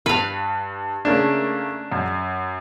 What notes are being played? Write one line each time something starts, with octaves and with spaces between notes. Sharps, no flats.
G2 B4 F5
C#3 A3 A#3 D4
F#2